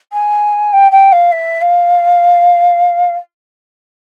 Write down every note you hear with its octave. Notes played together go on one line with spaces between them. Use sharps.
G#5
G5
G5
F5
E5
F5